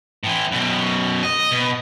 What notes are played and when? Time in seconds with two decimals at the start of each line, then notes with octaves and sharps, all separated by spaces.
0.24 A2 E3
0.52 F#2 B2
1.23 D#5
1.51 B2